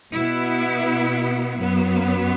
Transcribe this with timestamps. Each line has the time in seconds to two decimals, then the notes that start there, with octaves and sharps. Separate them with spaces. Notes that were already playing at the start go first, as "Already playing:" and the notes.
0.14 B2 B3 E4
1.56 F#2 F#3 B3